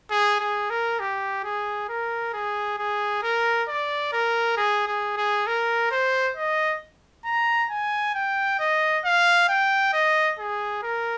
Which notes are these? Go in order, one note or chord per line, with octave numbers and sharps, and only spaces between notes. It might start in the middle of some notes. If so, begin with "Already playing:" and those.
G#4
G#4
A#4
G4
G#4
A#4
G#4
G#4
A#4
D5
A#4
G#4
G#4
G#4
A#4
C5
D#5
A#5
G#5
G5
D#5
F5
G5
D#5
G#4
A#4